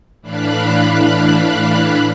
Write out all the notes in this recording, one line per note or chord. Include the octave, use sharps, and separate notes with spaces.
A2 E3 D4 F5 B5 F#6